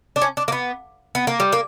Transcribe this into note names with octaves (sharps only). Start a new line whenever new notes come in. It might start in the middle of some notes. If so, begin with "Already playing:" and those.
D4
C#4
D4
A#3
B3
B3
A#3
G3
A#3